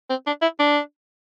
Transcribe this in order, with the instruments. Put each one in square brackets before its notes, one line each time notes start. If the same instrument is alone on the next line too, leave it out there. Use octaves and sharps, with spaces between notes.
[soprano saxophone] C4
D4
E4
D4